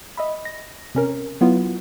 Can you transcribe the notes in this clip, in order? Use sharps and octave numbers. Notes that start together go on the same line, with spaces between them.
D#5 E5 B5
A#6
C3 C#4 A#4
F#3 B3 E4 F4